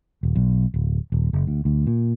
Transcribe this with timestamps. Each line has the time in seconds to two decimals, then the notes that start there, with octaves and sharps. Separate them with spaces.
0.23 D#1
0.35 B1
0.74 D1
1.12 D#1
1.33 F#1
1.47 D2
1.65 D2
1.87 A#2